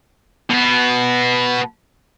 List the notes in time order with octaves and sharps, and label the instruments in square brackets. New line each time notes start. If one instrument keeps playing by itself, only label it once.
[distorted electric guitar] B2 B3